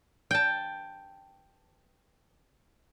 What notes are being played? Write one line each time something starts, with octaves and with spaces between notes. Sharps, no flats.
G5 A5